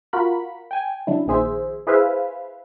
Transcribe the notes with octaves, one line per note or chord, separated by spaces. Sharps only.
F4 F#4 A#4 B5
G5 G#5
C#3 F#3 D4 E4
A#1 A#2 D#3 G#4 C5 E5
E4 G#4 B4 C5 E5 F5